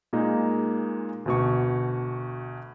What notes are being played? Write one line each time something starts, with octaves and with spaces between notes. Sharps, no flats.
A#2 G#3 A#3 D#4
D2 B2 C#6